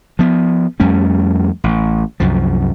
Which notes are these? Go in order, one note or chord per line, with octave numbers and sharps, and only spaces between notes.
F3 B3
F2 G3 A3 C#4
A1
C2 F#2 F3